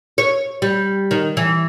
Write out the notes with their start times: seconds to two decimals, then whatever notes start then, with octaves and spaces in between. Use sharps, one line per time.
0.18 C#5
0.62 G3
1.11 D#3
1.37 E3